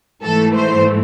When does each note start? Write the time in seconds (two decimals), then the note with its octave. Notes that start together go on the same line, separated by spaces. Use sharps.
0.23 G#2 E3 A3 A4
0.55 C5